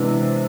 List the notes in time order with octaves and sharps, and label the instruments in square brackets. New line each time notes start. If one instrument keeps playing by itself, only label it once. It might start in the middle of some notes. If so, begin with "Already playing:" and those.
Already playing: [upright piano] C3 E3 G#3 B3 D4